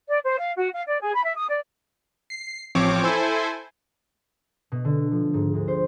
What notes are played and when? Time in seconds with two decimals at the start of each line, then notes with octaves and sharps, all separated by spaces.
0.09 D5
0.23 C5
0.38 F5
0.57 F#4
0.73 F5
0.87 D5
1.00 G#4
1.13 B5
1.25 E5
1.37 D#6
1.49 D5
2.30 C7
2.75 A1 F3 C4 C#5 D6
3.03 E4 A4 C5 G#5
4.72 B2
4.85 D3
5.11 F3
5.34 G#2
5.54 D2
5.68 C5